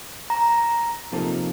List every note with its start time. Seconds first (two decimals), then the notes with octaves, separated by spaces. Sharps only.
0.30 A#5
1.12 C3 F3 A#3 D#4 A4